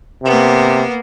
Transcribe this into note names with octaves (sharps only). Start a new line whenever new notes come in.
C3 A#3 B3